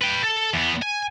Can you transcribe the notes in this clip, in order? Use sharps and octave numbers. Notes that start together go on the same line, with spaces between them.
B4 G5
A4
E2 B3
G#5